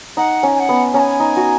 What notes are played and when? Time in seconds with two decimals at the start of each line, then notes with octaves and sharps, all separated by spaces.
0.17 D#4 F#5
0.43 C#4
0.56 G#5
0.60 F#5
0.69 B3
0.94 C#4 A#5
0.99 G#5
1.20 D#4
1.37 F#4